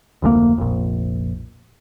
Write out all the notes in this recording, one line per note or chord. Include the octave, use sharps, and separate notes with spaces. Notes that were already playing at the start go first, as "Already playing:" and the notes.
F1 D2 A#2 A#3
F1 A#1